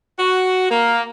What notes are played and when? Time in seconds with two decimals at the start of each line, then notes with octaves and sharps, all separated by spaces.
0.19 F#4
0.70 A#3